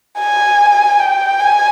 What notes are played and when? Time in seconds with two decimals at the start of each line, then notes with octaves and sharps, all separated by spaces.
0.19 G#5
0.99 G5
1.40 G#5